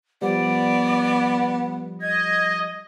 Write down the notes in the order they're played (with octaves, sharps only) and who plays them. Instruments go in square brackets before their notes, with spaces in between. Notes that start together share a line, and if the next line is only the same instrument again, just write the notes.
[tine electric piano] F3 G3 [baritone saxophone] B3 [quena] D5
[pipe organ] D#5 [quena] G#6